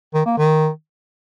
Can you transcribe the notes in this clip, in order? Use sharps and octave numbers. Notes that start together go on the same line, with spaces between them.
D#3
A#3
D#3